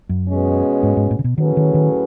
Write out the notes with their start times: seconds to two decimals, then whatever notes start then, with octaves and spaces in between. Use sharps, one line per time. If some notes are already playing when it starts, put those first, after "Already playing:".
0.09 F#2
0.28 B2 G#3 C#4
0.83 G#2
0.97 G#2
1.11 A2
1.19 C#3
1.24 B2
1.38 A2 D#3 F#3 C#4 G#4 B4
1.57 D#3
1.74 D#3